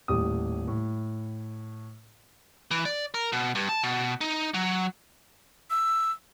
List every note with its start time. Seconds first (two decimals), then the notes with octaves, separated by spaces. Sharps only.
0.08 D#1 A2 G4 D#6
0.68 A2
2.71 E3
2.85 D5
3.14 A#4
3.32 B2
3.55 G2
3.69 A5
3.83 B2
4.21 D#4
4.54 F#3
5.70 E6